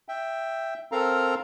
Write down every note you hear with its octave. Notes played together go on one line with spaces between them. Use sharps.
E5 G5
C4 A4 A#4 F5 A#5